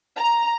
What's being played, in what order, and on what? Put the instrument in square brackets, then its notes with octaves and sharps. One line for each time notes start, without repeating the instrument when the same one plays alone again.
[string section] A#5